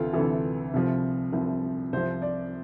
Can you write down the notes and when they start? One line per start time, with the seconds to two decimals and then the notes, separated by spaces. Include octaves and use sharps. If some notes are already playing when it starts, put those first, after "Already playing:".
Already playing: D2 C3 E3 F4 A4
0.13 D2 C3 E3 A4
0.74 C2 C3 F3
1.33 C2 C3 F3
1.93 C2 C3 F3 C5
2.22 D5